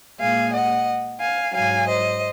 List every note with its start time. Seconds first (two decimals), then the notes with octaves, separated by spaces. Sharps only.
0.19 A#2 G#3 F5 G#5
0.52 D#5 F#5
1.19 F5 G#5
1.53 G#2 F#3 F5 G#5
1.87 C5 D#5